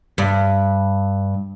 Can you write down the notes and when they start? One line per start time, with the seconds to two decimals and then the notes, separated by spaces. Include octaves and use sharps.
0.18 G2